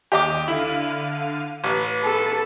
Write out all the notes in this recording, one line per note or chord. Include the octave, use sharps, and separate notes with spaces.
D#2 G4 D#5 D6
D3 E4 F5 D#7
A1 B4
A4